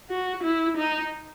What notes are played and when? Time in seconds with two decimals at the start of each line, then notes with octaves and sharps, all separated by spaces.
0.10 F#4
0.43 E4
0.77 D#4